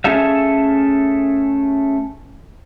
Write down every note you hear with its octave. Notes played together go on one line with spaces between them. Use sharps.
A3 C#4 G#4 A4 E5 F5